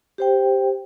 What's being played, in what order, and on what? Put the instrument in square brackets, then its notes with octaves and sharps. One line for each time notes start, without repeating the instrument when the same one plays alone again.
[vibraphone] G4 C5 G5